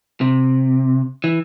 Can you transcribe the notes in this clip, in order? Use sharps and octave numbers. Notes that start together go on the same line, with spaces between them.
C3
E3